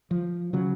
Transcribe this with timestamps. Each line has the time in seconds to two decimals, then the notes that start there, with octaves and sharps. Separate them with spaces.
0.11 F3
0.53 C#3 F#3